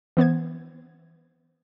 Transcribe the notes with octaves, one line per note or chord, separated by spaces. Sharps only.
E3 B3 C5 G#6